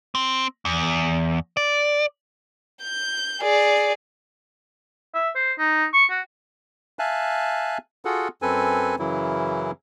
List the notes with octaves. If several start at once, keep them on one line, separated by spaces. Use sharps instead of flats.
C4
E2
D5
G6
G#4 D5
E5
C5
D#4
C#6
F#4
E5 F5 G#5 A5 F#6
F4 F#4 G#4 A4 F#5
F#2 C4 A4 B4 G#5
F#2 C#3 E3 F#3 E4